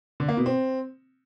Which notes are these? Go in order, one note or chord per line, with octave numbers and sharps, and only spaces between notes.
D3
A#3
B2
C4